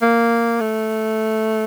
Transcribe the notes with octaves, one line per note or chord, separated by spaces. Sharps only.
A#3
A3